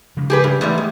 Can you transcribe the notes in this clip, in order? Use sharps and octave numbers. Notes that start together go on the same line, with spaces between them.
C#3 F3 G#3
G4 G#4 B4
G2
E2 G#2 G3 A3
G#3